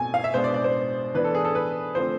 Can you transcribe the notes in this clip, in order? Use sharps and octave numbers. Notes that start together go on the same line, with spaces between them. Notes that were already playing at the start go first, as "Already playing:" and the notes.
Already playing: B2 A3 C4 G#5
F5
E5
B2 G#3 B3 D4 C5
D5
D5
C5
E3 B3 D4 B4
A4
G#4
A4
B4
D3 F3 A3 C4 C5